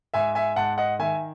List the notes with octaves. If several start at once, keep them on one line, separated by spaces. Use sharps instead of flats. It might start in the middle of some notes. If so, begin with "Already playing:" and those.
G#2 E5 G#5
E5 G#5
G#2 F#5 A5
D#5 F#5
D#3 E5 G#5